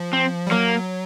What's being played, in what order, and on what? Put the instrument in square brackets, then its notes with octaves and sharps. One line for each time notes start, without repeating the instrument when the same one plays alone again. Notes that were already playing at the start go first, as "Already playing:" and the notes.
Already playing: [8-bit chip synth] F3
[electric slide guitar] C4
[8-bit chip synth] G3
[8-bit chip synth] F#3 [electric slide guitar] A#3